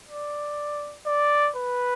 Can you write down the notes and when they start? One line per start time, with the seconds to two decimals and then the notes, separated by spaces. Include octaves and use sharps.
0.09 D5
1.06 D5
1.56 B4